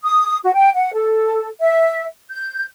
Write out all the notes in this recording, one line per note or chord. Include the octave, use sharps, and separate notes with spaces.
D#6
F#4
G5
F#5
A4
E5
G6